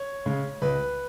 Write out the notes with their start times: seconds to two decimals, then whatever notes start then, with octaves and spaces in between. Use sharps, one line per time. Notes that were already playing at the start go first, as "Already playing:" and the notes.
Already playing: C#5
0.26 C#3 G#3
0.62 C#2 B4